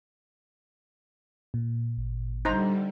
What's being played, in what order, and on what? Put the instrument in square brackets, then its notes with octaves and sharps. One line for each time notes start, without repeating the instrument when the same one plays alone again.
[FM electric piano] A#2
[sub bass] G#1
[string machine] D3 G3 [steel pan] D#4 C5 A#5